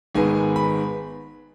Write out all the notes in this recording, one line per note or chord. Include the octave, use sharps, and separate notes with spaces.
G#1 G#2 D#3 G#3 B3 G#5
B5